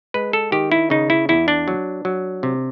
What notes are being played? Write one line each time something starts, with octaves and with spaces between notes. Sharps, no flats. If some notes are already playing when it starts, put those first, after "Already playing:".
G#3 B4
A4
D#3 G4
E4
C#3 D#4
E4
E2 E4
D4
F#3
F#3
C3